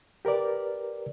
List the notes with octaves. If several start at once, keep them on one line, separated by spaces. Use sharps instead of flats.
G4 A#4 B4 D5